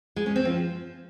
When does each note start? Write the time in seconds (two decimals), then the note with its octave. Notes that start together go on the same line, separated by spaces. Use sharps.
0.16 G#3
0.26 C#4
0.36 C4
0.45 F3